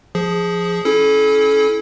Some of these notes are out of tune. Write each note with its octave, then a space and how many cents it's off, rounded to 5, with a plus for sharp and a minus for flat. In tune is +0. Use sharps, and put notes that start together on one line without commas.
F3 +0 G#4 +0
C#4 +0 E4 +0 A4 -35